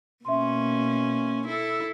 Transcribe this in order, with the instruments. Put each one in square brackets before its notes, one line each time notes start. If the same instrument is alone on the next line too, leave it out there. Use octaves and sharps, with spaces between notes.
[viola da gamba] B2 A#3 C#4 [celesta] E5 C6
[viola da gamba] E4 A4